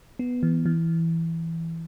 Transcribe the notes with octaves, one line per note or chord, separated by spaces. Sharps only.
B3
E3
E3